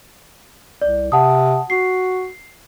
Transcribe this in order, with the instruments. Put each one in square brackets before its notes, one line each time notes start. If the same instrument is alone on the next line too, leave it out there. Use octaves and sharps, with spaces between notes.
[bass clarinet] C2 [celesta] D5
[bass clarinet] C3 [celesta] F#5 A5 D#6
[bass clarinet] F#4 [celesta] C7